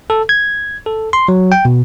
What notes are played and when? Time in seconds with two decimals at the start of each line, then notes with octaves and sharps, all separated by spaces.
0.10 A4
0.29 G#6
0.86 A4
1.13 C6
1.28 F#3
1.52 G5
1.65 B2